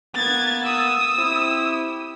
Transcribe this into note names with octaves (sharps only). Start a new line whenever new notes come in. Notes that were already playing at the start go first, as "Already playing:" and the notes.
A#3 B3 G#6 A6
D#6 E6
C4 E4 G4